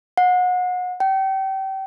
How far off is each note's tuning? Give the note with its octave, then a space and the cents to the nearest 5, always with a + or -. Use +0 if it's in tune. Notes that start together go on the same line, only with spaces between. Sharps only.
F#5 -30
G5 -30